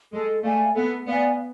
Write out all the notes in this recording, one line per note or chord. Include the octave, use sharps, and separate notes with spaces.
G#3 A4
A3 D5 F5 G#5
B3 A4
B3 D5 F5 G#5